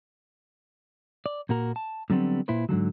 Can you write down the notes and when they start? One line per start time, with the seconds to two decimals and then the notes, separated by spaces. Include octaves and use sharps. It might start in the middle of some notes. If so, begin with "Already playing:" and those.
1.26 D5
1.49 A#2 A#3 F#4 A#4
1.76 A5
2.10 A2 D3 F#3 G3 B3 C4
2.48 A#2 E4 B4 C5
2.69 G#2 D3 F3 F#3